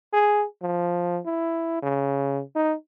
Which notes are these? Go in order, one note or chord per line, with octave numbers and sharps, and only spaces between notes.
G#4
F3
E4
C#3
D#4